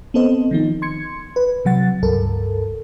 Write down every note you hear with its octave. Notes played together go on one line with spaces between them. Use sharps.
B3 C4 A4 C5 D#5
D#3 F3 D#4
C6 G#6 C#7
B4
C3 F#3 F#5 A6
C#2 G2 A4 A#4